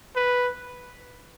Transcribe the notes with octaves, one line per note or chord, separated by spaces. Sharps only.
B4